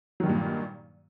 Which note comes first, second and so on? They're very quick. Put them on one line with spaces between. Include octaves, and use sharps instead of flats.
F#3 D#3 G2 A#2